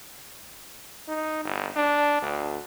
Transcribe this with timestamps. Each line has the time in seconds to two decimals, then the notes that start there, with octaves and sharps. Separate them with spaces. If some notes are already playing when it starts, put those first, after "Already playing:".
1.08 D#4
1.45 G1
1.76 D4
2.22 D2